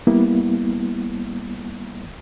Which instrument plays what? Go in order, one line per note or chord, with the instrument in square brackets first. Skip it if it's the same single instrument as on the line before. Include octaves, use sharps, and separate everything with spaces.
[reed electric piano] G3 A#3 B3 E4